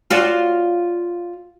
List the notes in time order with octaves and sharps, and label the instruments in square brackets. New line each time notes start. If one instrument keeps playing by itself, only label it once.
[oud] F4 F#4 D5